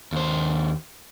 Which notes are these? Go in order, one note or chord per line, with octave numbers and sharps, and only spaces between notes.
D#2 C5